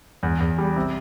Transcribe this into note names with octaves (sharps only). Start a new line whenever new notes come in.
E2
E2
G3
C3